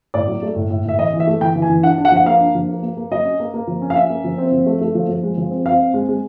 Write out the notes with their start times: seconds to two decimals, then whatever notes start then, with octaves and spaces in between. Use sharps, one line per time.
0.14 A2 D5
0.28 F#3
0.42 A3
0.56 A2
0.70 A2
0.85 A2 E5
0.99 E3 D#5
1.13 E3
1.20 E5
1.27 A3
1.41 E3 G5
1.55 E3
1.62 G#5
1.69 E3
1.83 D4 F#5
1.98 D4
2.05 F#5
2.11 F3
2.17 F#5
2.26 A#3 F5
2.40 D4
2.54 F3
2.69 A#3
2.82 A#3
2.97 A#3
3.11 F#3 D#5
3.25 C#4
3.40 A#3
3.54 A#3
3.67 F3
3.82 C#4
3.90 F5
3.96 C#4 E5
4.10 A#3
4.24 F3
4.38 C4
4.52 F3
4.66 A3
4.81 A3
4.95 F3
5.09 F3
5.23 G#3
5.37 F3
5.51 C4
5.65 C4 F5
5.80 C4
5.94 G#3
6.09 G#3